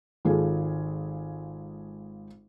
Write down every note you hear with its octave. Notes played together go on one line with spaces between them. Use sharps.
G#1 G#3 F4 G#4 A4